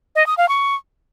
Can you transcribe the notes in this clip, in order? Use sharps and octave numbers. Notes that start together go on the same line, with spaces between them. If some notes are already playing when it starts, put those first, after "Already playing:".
D#5
D#6
F5
C#6